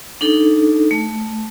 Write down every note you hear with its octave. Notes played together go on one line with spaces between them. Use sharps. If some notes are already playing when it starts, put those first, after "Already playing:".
D4 D#4 A4
A3